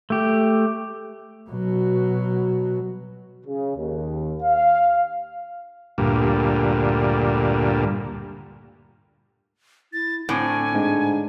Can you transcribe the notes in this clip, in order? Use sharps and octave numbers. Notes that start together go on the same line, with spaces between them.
A3 G4
B2 F#3
C#3
D#2
F5
D2 G2 A#2
E4 A6
A2 D3 C4 G#5
G#2 D4